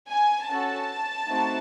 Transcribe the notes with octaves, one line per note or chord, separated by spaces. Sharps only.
G#5
C#4 F#4 A4 A5
A3 C4 D#4 F#4